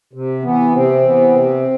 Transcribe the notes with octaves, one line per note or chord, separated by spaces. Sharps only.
C3
E3 B3
C3 C4
E3 B3
C3